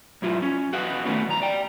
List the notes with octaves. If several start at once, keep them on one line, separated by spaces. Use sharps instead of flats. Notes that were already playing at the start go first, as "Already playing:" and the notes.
B1 G#2 F#3 E4 F4
C#4
F#4 B4 D#5 F5 F#5
D#3 A3 B3 C#4
C#2 F#2 A#5
D5 G5